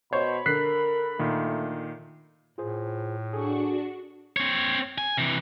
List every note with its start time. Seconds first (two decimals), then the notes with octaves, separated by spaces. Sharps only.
0.13 B2 C5 C#5 B5
0.46 D3 A#4 F#6 B6 C7
1.19 A#2 D#3 A3
2.58 A2 F4 G#4 C5
3.33 D4 F#4 G#4 A4 C#6
4.36 C4 C#5
4.98 G#5
5.18 C3 E3